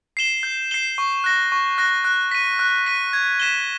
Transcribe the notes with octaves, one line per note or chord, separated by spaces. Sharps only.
C7 E7 G7
G6
C7 E7 G7
C#6
F#6 A#6
C#6
F#6 A#6
F#6
B6 D#7
F#6
B6 D#7
G#6
B6 E7 G7